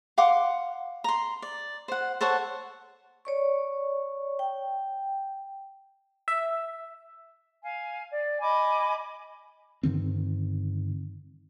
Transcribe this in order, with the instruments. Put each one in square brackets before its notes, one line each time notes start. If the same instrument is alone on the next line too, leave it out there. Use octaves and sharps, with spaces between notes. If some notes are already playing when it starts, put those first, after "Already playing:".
[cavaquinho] F5 F#5 C6 D6
A#5 C6
D5
C5 F#5
A4 C5 C#5 F#5
[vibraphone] C#5 D5 C#6
G5
[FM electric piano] E5
[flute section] F5 G#5
D5
D#5 G#5 B5 D6
[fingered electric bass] G2 D3 D#3 C4